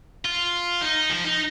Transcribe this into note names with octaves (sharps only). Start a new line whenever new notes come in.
F4
D#4
F3
D#4